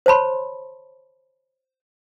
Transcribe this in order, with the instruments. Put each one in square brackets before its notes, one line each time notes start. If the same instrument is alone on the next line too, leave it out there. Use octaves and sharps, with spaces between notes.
[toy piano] C5 C#5 A5 B5 C6